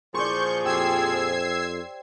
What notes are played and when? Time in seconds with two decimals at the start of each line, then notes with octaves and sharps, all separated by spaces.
0.14 A#2 F3 G#4 C5 D5 C#6 G6
0.65 F2 G4 E6 G#6 C7